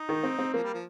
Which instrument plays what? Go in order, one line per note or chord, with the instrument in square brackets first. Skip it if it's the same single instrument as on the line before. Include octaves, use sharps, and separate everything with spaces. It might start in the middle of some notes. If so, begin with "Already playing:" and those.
Already playing: [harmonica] D#4
[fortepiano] D#3
C4
C4
[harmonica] F3 [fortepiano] A#3
[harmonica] G3
F3